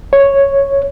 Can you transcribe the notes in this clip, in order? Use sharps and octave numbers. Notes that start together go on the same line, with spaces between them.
C#5